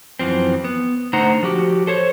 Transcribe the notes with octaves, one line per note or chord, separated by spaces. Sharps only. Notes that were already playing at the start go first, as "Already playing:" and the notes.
F#2 E3 F3 C4
B3
D3 A3 D#4 C5 F#5 A#5
F3 F#4 G4
A4 C5 C#5